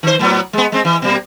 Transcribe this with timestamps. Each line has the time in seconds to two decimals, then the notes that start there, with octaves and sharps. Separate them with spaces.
0.03 D#3 C5
0.19 A2 F#3 B3
0.53 G#3 B3
0.72 G#3 C4
0.85 E3
1.02 B2 G3 A#3